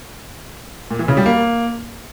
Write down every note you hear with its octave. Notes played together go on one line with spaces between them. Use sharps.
A#2
E3
C#3
G3
A#3